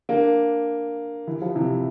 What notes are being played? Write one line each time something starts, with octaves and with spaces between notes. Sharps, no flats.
A#3 D4
E3
F3
C3 E3